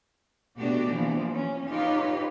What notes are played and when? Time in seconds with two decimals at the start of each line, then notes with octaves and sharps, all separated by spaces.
0.59 B2 A3 B3 D4 F#4 G4
0.90 E3 F3 A#3 B3
1.32 C#4
1.70 D#4 F4 G4 B4 C#5